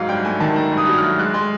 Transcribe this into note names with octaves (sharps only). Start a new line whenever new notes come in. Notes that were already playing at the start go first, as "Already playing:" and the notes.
Already playing: G#2 F#3 F5
G2 G5
A3 G#5
D#3 A5
A3 A#5
G2
D#6
F#3
F6
A3
G#3 F#6
G#3 C6